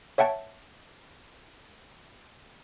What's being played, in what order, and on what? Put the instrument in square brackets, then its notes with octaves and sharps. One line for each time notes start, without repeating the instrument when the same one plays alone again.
[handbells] C#5 E5 F#5 G5 A5